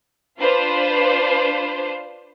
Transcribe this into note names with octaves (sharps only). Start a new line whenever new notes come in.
D4 F4 B4 C5